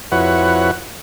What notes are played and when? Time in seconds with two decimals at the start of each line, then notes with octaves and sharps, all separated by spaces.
0.12 F2 E4 F#4 B4 C#5 F#5